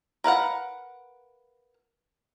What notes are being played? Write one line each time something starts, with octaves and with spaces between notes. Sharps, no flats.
A#4 B4 F5 F#5